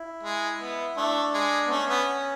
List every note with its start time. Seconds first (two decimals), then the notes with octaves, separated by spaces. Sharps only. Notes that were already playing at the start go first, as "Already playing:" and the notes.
Already playing: E4
0.23 G#3
0.60 B3
0.97 A3 D4
1.34 G#3
1.67 B3
1.71 A3 C#4
1.90 B3